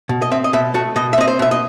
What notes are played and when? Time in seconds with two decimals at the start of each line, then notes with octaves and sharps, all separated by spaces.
0.09 B2
0.22 D#5
0.32 C4 E5
0.44 D#5
0.53 B2 E5
0.74 A3 F#4
0.96 B2 D#5
1.13 E5
1.18 C4 D#5
1.28 C5
1.39 B2 E5
1.51 D#5